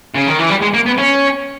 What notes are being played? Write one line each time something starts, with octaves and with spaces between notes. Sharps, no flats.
C#3
D#3
E3
G3
G#3
A#3
B3
C#4